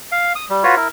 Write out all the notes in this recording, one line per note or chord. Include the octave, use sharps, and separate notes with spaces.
F5
D#6
G3
F4 F#4 B4 C#5
E4 A#4